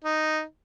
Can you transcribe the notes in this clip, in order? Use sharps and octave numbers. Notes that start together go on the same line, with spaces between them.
D#4